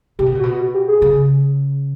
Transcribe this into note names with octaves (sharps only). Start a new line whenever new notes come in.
C3 G4
B2
A#2
F#4
B2
F#4
G4
G#4
C#3